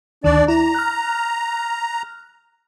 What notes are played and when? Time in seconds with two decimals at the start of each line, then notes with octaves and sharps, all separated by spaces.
0.24 D2 D#3 D4 D5
0.48 E4 A#5
0.74 F6 F#6